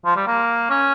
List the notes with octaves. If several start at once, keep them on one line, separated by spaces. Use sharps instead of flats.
F3
G3
A#3
C#4